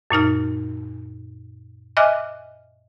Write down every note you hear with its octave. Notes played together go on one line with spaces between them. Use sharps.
F#2 A#2 D#4 F6
D#5 E5 G#5 D6 F6 F#6